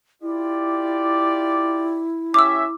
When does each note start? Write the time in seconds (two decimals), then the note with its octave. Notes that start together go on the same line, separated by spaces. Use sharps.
0.22 E4 F4 G4 D5
2.34 C#4 G4 E5 D6 E6